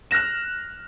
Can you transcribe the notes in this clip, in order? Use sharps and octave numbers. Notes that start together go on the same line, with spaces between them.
F6 F#6 A#6 E7